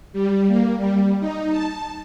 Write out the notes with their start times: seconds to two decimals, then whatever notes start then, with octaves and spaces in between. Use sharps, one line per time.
0.13 G3
0.47 A#3
0.78 G3
1.20 D#4
1.51 A5